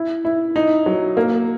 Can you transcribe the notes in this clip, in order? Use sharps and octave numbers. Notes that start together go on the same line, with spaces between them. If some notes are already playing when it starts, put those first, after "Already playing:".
Already playing: E4
E4
D#4
F#3
A#3